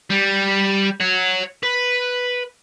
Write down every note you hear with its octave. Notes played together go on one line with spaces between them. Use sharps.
G3
C#5 F#5
B4